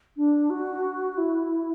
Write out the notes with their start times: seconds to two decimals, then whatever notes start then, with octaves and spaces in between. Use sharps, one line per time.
0.17 D4
0.50 F#4
1.18 E4